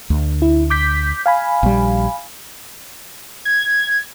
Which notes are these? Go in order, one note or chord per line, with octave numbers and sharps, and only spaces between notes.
D2
E4
D6 G6 B6
F5 G#5 B5
A#1 G3
G#6